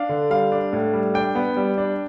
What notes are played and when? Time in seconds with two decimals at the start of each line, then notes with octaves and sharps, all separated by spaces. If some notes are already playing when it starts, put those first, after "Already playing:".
Already playing: D4 F5
0.09 D3
0.30 G3 F5
0.52 D4
0.73 A2
0.93 G3
1.14 D4 G5
1.35 B3
1.57 G3
1.78 D4